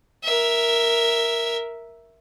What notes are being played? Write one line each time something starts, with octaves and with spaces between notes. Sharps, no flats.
A#4 E5